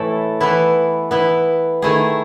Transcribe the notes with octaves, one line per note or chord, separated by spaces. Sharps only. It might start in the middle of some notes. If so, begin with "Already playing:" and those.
Already playing: A2 E3 A3 E4 A4
E3 B3 E4
E3 B3 E4
D#3 A3 E4 G#4